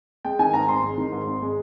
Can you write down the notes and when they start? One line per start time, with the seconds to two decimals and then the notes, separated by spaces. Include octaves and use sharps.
0.25 G#3 G5
0.39 D#3 G#5
0.53 G#2 A#5
0.69 G#1 C6
0.83 G#3
0.98 D#3
1.12 G#2
1.27 G#1
1.42 G#3